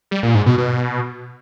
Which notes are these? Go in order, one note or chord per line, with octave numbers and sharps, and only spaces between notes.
G3
A#2
G#2
B2
B2